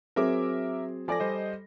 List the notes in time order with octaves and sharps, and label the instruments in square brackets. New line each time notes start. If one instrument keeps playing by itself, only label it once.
[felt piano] F#3 C4 G#4 [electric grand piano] A#4 E5 D6
[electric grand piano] F3 D5 A#6 [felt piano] A4 G#5 D6
[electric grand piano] G3 C5 D#5